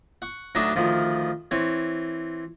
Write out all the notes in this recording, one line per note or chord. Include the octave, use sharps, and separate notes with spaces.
F#5 C#6
D2 F#3 D4 D#4 D5 E5
D2 D#3 F3
E3 C4 C#5